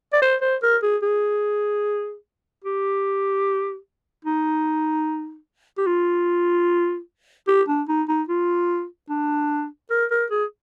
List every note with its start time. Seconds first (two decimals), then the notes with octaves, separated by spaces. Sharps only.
0.13 D5
0.22 C5
0.42 C5
0.63 A#4
0.83 G#4
1.02 G#4
2.64 G4
4.25 D#4
5.78 G4
5.87 F4
7.48 G4
7.68 D4
7.89 D#4
8.09 D#4
8.29 F4
9.10 D4
9.91 A#4
10.11 A#4
10.30 G#4